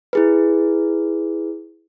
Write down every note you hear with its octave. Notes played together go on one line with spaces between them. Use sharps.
E4 G#4 B4